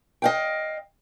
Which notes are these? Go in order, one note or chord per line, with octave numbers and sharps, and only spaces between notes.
D#5 F5 G5